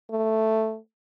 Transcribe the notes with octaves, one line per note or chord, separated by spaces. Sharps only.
A3